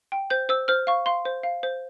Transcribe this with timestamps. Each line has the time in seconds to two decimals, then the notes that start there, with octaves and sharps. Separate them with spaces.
0.12 G5
0.30 C5 G6
0.49 C5 E6
0.68 C5 F6
0.87 F5 C#6
1.06 F5 C6
1.25 C5
1.43 F5
1.63 C5